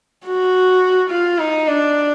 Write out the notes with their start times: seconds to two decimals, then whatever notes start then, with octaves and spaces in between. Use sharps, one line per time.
0.26 F#4
1.10 F4
1.39 D#4
1.68 D4